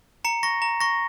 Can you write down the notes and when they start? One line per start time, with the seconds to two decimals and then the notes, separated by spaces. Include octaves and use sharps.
0.25 A#5 C#7
0.43 C#6 A#6
0.62 A#5
0.80 C#6 A#6